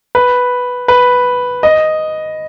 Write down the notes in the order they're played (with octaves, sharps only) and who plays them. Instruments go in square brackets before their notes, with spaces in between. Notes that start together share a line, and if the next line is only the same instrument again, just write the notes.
[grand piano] B4
B4
D#5